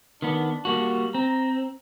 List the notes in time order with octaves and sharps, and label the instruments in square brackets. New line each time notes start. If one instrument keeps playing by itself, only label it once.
[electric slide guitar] D#3 B3 [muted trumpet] D4
[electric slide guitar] G3 A#3 F#4
[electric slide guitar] C4 [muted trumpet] A#5